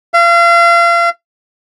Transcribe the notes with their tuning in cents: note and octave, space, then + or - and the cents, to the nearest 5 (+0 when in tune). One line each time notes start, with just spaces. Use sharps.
F5 -35